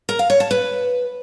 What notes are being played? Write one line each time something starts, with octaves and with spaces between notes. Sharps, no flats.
A#4
F5
C#5
A5
B4